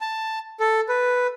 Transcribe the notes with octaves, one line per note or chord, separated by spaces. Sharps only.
A5
A4
B4